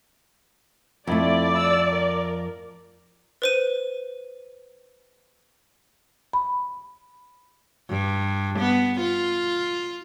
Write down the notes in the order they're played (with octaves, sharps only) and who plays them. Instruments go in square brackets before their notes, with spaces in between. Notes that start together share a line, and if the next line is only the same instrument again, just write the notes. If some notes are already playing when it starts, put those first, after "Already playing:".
[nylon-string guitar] F2 A3 [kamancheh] E4 [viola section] D5
[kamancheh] E6
A#4
[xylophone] B4 C5 D#7
[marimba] B5
[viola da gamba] G2
B3
F4